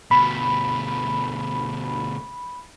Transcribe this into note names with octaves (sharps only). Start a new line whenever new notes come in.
D2 B2 B5